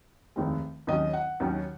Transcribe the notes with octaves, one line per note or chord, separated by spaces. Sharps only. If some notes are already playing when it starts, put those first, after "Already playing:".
F1 D#2 D#3 G#3 C4
D#2 D#3 F#3 C#4 D#5
F#5
D#2 D#3 F#3 C#4